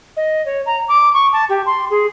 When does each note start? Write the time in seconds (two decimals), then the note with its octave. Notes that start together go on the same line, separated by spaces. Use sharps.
0.16 D#5
0.45 C#5
0.66 A#5
0.88 D6
1.14 C#6
1.32 A5
1.49 G4
1.66 C6
1.90 G#4